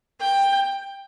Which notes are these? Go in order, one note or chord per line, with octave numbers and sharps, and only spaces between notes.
G5